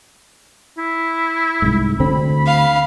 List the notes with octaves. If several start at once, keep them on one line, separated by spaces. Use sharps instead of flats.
E4
C2 G#2
D2 D3 C4 B5
F5